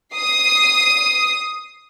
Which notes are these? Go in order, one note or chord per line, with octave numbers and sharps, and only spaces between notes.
D#6 C7